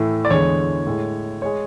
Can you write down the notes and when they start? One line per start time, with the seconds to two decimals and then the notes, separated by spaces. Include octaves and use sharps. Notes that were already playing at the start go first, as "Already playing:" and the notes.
Already playing: A2 E3 A3
0.25 D5
0.30 E2 D3 G#3 C#5
0.87 A2 G#3
1.42 G#3 C#5